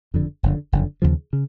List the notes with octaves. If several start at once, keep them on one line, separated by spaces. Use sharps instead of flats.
F#1 F2 D3
F#1 F2 D3
F#1 F2 D3
D#2 C#3 F3
C#3